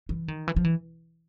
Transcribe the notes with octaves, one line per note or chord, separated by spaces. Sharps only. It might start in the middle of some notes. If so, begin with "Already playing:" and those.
E3
D#3
E3
F3
E3